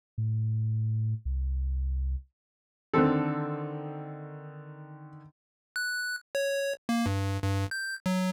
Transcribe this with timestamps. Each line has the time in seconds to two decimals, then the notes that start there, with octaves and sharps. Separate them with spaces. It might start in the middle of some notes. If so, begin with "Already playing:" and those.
0.18 A2
1.25 C2
2.94 D3 D#3 C4 A4
5.76 F#6
6.35 C#5
6.89 A#3
7.06 G2
7.44 G2
7.71 G6
8.06 F#3